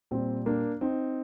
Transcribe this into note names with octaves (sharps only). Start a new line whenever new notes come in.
A#2 G3 C4
A#3 D4
C4 D#4